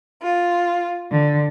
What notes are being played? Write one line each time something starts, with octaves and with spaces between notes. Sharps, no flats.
F4
D3